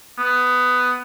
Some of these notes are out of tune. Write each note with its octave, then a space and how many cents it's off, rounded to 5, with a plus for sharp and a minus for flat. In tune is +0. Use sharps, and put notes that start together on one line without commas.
B3 +10